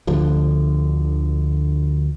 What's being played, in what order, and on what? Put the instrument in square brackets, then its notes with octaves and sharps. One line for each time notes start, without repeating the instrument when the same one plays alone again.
[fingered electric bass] D2 D3 F3